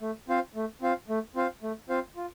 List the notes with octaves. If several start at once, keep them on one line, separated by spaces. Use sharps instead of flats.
A3
C4 F4 C5 F5
A3
C4 F4 C5 F5
A3
C4 F4 C5 F5
A3
C4 F4 C5 F5
F4